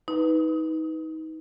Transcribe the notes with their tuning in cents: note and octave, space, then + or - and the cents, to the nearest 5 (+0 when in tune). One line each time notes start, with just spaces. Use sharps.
D#4 +30 B4 +0